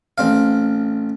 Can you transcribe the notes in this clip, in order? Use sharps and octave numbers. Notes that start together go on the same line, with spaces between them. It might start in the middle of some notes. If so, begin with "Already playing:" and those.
A1 C4 F5